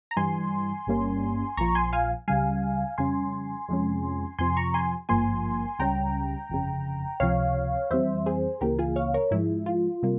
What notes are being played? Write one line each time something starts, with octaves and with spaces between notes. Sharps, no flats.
A#5
G2 E3 G3 G#5 C6
G1 G2 G3 A#3 C#4
A#1 A#2 F3 A#5 C#6
G#5 C6
F5 G#5
C#2 C#3 G3 F5 G#5
F2 C#3 G3 C#4 G#5 C6
F2 C3 F3 G#3 C#4
F2 C3 F3 G#5 C6
A#5 C#6
G#5 C6
G#1 G2 F3 A#3 G#5 C6
C#2 C#3 G3 C#4 G5 A#5
G1 F2 C#3
C#2 C3 F3 C#5 F5
F2 E3 G3 C4 C5 E5
G#4 C5
C#2 C#3 E3 A#3 G4 A#4
F4 G#4
C#5 F5
A#4 C#5
G#2 F3 G#3 E4
F4
C3 G3 A#3